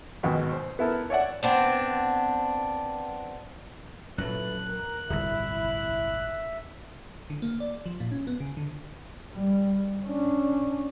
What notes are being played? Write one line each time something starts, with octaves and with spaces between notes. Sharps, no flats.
G#1 D#2 B2
C5
B3 E4 A4 A#4
C#5 D5 E5 F#5
B3 C4 D4
F#2 A#2 F#3 E4 A4 B4 F#6
A#4
D1 G1 C2 E4 E5
D3
A#3
D5
F3
A#2
C#4
B3
C#3
D3
G3
C#4 D4